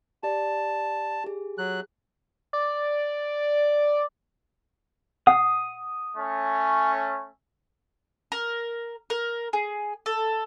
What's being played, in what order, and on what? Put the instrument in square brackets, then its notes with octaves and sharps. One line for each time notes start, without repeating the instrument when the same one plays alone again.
[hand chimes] G4 D5 [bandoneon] A5
[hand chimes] G4 G#4
[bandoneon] F#3 F#6
[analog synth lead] D5
[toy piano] F#5 [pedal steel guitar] D#6
[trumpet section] A3 C#4
[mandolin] A#4
A#4
G#4
A4